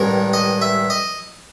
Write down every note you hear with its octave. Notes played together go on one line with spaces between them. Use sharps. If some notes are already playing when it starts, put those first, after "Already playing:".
Already playing: A1 G2 D#3 G#3 A#4
D#5
E5
D#5